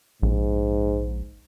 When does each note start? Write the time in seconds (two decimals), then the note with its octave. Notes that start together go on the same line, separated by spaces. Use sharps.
0.22 A#1 G#2